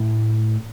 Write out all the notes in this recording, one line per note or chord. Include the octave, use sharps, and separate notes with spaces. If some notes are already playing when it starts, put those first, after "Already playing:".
Already playing: A2